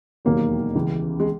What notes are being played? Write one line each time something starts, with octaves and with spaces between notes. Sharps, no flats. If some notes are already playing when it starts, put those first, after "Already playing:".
E1 D#2 D#3 F#3 A#3
C#2 C#3 E3
G#3